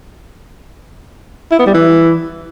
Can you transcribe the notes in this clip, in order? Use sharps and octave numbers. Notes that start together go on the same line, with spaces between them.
E4
B3
G3
E3